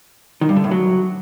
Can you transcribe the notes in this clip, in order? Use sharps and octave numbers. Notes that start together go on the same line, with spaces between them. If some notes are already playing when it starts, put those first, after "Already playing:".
D#3
G2
D3
A2
F#3